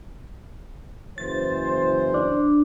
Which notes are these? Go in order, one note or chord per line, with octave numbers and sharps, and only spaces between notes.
F#1 E3 C5 A6
D4